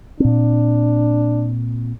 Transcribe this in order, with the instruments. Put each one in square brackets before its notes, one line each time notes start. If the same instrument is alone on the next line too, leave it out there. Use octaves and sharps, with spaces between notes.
[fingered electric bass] A#2 C4 [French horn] D4